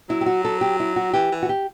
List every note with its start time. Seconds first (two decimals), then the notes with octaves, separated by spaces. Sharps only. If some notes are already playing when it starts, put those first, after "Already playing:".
0.09 F#3 E4
0.21 G4
0.26 F#4
0.45 A4
0.61 G4
0.80 E4
0.96 F#4
1.13 E3 G4
1.31 E3
1.43 F#4
1.49 G4